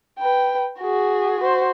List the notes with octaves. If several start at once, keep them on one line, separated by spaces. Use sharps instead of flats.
B4 G5
F#4 G#4
F#4 C5